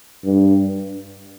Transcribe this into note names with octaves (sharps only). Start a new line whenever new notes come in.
G2